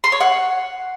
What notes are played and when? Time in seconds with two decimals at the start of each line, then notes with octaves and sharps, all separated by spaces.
0.04 C6
0.12 C#5
0.20 F#5